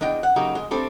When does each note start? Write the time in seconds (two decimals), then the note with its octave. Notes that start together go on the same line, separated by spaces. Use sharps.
0.01 E2 D4 D#5 G5
0.23 F#5
0.36 C#3 F#3 A#3 D#4 F#4 G4
0.55 G#3
0.71 G3 A3 C4 D4 A4